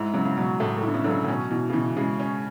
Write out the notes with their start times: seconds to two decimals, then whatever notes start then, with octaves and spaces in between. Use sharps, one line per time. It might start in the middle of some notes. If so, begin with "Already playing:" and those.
Already playing: G#2 E4
0.14 C#3 F#3
0.25 C#3
0.37 B2 F#3
0.60 A2 A3
0.77 A2
0.83 E4
0.88 D3
0.94 C#3
1.04 D3 F#3
1.10 C#3
1.24 A2
1.28 B2 C#4
1.51 B2 E3
1.70 C#3
1.73 B2 E3
1.96 C#3 G#3
2.19 C#4